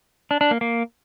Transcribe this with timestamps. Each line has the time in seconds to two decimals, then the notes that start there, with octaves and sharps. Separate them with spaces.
0.31 D4
0.41 D4
0.51 A#3
0.61 A#3